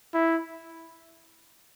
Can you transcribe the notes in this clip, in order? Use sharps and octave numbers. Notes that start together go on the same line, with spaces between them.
E4